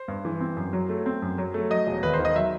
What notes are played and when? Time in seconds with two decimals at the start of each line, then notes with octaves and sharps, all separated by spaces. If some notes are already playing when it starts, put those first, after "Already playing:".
Already playing: C5
0.08 G2
0.25 E3
0.40 C4
0.57 F#2
0.73 F#3
0.89 A3
1.06 C4
1.22 F#2
1.38 F#3
1.54 A3
1.70 F#3 D#5
1.87 E1
2.03 D#2 B4
2.14 C5
2.19 D#3
2.25 D#5
2.35 F#3 E5